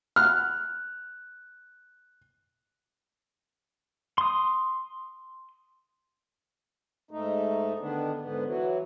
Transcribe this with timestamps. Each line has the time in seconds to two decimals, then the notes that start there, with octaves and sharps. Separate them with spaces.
0.16 F6 F#6
4.18 C6 D#6
7.11 G#2 A3 D#4
7.79 D3 D#3 B3 D4
8.19 G#2 D3 B3
8.44 E3 F#3